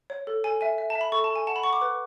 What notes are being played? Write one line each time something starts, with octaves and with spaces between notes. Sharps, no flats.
C#5
A4
A4 G#5
E5 G#5
E5
A5
E5
B5
A4 C#6
A5
A4
G#5
F#5 A5
B5
F#5 C#6
D6
B4